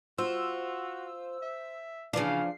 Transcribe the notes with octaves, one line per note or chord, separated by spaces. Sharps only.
F4 F#4 C5 E6
E5
C#3 E3 F3 D4 F5 C7